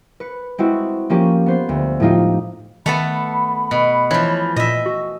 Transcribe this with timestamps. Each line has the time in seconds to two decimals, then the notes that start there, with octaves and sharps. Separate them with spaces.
0.20 B4 C#7
0.58 G#3 C4 E4 F#4
1.10 F3 A#3 C#4 G4
1.46 B3 C5 C7
1.69 D2
2.00 A2 F3 G#3 D#4 F4 G4
2.86 D#3 A3 B3 A5 B5
3.71 B2
4.11 E3 F3 C#5
4.56 A#2 D#5 E5
4.86 F#4